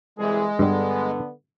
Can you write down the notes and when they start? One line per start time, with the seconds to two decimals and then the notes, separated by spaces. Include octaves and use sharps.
0.19 C2 E3 G#3 G#4
0.59 G2 D3 G3 B3